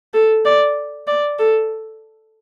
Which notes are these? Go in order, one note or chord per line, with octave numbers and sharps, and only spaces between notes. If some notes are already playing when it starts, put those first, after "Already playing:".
A4
D5
D5
A4